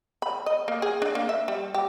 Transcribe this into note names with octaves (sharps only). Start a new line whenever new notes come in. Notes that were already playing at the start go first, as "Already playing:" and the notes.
B5
D#5
A#3
G#4
D4
A#3
E5
G3
G4